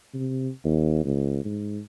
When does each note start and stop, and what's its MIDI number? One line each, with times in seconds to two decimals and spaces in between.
0.14 0.49 48
0.64 1.01 39
1.04 1.44 37
1.45 1.80 44